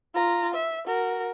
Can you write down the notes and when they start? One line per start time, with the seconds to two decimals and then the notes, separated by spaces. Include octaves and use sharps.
0.14 F4 A#5
0.54 E5
0.86 F#4 A#4